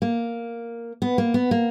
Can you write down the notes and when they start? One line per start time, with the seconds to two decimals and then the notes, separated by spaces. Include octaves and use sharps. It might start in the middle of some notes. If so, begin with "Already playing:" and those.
0.02 A#3
1.02 B3
1.18 A#3
1.34 B3
1.51 A#3